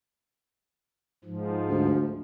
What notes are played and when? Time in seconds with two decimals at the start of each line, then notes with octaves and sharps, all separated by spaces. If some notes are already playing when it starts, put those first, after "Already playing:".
1.24 G#2 F3
1.69 D2